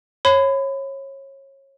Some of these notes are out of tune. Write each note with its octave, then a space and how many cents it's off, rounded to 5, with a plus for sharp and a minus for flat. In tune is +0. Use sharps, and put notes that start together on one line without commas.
C#5 -25 B5 +30